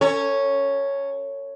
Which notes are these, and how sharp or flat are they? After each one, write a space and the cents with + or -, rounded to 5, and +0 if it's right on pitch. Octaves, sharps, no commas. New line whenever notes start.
C#4 +0 A4 +40 C#5 +0